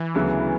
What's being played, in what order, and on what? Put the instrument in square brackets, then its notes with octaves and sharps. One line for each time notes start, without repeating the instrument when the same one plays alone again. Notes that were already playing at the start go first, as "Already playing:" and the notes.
Already playing: [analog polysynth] E3
[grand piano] D2 C#3 F#3 B3